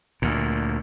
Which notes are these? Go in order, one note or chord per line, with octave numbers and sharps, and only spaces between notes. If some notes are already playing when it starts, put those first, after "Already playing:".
D2 A#2